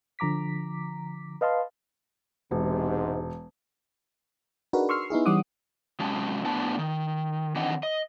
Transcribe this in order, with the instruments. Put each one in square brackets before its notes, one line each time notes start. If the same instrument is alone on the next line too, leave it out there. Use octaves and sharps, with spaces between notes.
[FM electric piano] D3 F3 A#5 D6 B6
B4 D#5 F5 A5 C6
[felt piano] E1 [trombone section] G#2 C3
[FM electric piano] D4 D#4 F#4 G#4 A#4 B4
C6 C#6 E6 F6 C7
B3 D#4 E4 G#4
E3 G3 C#4 F#5 D6 D#6
[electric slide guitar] C3 F#3 G#3 C#4 A5
A2 B3 D4 A5
D#3
D#3 E3 C4 D4 D#5 F#5
D#5